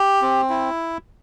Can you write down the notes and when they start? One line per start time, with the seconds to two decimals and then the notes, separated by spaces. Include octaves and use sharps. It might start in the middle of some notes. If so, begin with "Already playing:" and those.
Already playing: G4
0.22 C4
0.50 E4